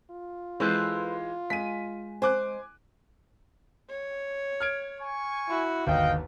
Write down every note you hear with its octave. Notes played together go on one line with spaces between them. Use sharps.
F4
E3 G#3 A4 B4 C5
G#3 B6 D#7
C5 G#5 D6 F#6
C#5
F6 G#6 D7
G#5 C#6
E4 F#4
G1 D#2 D#5 F5 G5